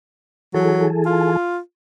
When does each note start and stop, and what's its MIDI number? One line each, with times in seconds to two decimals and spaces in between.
0.54 1.37 52
0.54 0.87 54
0.54 1.37 68
0.54 1.37 69
1.06 1.59 65